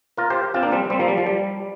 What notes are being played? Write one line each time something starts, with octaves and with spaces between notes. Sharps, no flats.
F4 A#4
G4 C5
C4 F4
A#3 D4
G3 C4
G3 C4
F3 A#3
G3
F3
G3